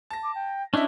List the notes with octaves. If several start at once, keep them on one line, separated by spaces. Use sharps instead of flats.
A5 A#6
D6
G5
C#4 D4 E4 D#5 E5 A5